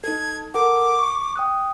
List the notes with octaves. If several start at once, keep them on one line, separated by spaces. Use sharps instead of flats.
D#4 A4 G#6
A4 A#4 F#5 D6
C#6
G5 D#6 F#6